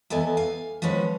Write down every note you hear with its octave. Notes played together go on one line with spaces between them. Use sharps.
E2 B3 A4 D#5 G#5
F5 G#5
F3 G#3 B3 C#4 B4